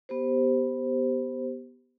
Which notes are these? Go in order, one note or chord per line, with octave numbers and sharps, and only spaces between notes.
B3 G4 C5